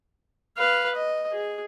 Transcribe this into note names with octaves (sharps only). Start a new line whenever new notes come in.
B4 F5
D#5
G#4